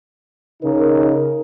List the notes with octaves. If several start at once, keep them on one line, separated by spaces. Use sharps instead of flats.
C#3 D#4 A#4